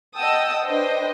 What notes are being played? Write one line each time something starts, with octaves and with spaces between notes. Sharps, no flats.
D#5 F#5 G5 A5 D#6 E6
D4 B4 C5 D#5 G5